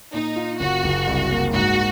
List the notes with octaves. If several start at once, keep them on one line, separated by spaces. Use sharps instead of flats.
A#2 D#4
F4
F#1 F#4
F#1
C2
A#3
G#2 F#4